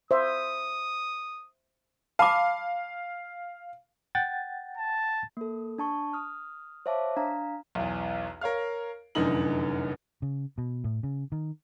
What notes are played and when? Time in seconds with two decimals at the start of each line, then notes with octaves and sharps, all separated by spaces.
0.11 C5 E5 D#6
2.19 F5 A5 B5 D6
4.15 F#5 G5 A6
4.78 A5
5.37 A#3 A4
5.78 D4 A5 C#6
6.13 D#6 F6
6.86 C5 C#5 E5 F5 A5 D6
7.17 D4 F5 A#5
7.75 B1 E2
8.41 A#4 C#5 F5 F6
9.15 F1 F#2 D3 E3 D#4 F#7
10.22 C#3
10.58 B2
10.84 A2
11.03 C#3
11.32 D#3